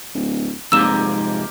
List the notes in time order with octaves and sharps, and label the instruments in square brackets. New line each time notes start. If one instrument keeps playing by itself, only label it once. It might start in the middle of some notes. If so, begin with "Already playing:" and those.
[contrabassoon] D1
[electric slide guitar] F2 C3 G#3 [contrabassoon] G#2 [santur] A#3 G4 [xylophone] E6 E7